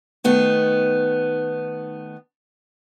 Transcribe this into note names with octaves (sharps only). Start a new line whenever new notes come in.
D#3 A3 B3 D#4